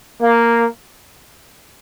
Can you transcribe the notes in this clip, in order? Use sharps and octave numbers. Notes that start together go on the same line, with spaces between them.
A#3